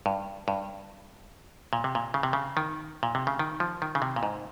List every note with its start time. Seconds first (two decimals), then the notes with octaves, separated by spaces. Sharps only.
0.06 G2
0.48 G2
1.73 A#2
1.84 C3
1.95 A#2
2.14 C#3
2.23 C3
2.33 C#3
2.57 D#3
3.03 A#2
3.15 C3
3.27 C#3
3.39 D#3
3.60 F3
3.82 D#3
3.95 C#3
4.02 C3
4.16 A#2
4.23 G#2